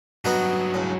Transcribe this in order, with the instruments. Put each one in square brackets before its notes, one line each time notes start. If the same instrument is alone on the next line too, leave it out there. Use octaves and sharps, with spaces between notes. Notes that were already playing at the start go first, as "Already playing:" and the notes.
[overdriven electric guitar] G2 F#3 [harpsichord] B3 D#4 F#4
[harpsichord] C#2 A2